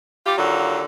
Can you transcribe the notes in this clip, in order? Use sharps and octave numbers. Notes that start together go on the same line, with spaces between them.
G3 F4 G4
D#2 D3 F#3 F4 F#5